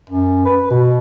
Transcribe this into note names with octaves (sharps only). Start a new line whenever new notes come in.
F#2
B4
B2